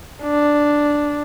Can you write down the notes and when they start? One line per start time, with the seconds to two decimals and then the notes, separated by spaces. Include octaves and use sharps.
0.22 D4